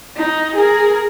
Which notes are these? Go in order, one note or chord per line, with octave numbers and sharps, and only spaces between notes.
D#4
G#4 A#4